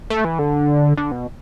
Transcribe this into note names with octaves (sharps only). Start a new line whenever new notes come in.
A3
E3
D3
D3
B2